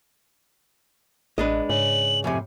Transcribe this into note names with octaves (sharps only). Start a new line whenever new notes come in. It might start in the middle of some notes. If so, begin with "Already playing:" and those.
A1 G#3 D4 B4 D#5
G#2 C#3 F#7
F2 A2 C3 G#5